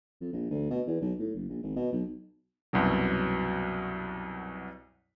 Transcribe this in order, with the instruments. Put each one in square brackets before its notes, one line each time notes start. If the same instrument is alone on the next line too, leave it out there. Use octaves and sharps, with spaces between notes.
[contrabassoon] F2
A#1
D2
B2
E2
B1
A2
F#1
A#1
G#1
B2
B1
[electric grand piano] C2 F#2 B2 F#3